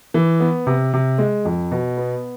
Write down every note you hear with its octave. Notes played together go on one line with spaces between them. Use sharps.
E3
B3
C3
C3
G#3
F2
B2
B3